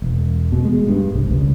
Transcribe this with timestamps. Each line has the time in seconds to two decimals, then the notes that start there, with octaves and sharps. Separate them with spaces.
0.02 E1
0.52 B2
0.65 G#3
0.88 G2
1.14 C2
1.31 C#2